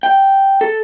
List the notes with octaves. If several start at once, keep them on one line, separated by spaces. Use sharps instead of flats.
G5
A4